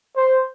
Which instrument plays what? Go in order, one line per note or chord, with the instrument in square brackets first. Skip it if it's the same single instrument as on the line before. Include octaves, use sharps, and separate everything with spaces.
[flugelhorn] C5